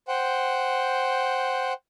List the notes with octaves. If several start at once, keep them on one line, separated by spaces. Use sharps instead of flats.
C5 F#5 G5